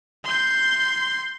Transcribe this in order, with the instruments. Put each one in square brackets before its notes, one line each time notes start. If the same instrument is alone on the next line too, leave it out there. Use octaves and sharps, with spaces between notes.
[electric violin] C6 G6